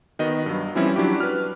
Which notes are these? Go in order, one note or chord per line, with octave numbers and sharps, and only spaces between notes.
D#3 B3 F#4 D#5
G2 F#3
E3 F3 G3 C4 C#4 E4
F#3 D4 E4 F#4 G4
B4 F6